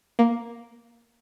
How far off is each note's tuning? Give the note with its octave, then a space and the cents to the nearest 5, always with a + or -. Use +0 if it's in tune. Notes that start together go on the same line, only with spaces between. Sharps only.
A#3 +5